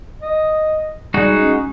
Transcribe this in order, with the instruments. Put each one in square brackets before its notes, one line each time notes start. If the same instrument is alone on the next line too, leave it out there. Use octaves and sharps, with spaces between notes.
[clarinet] D#5
[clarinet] G3 [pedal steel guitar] G#3 D#4 F#4
[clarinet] C#4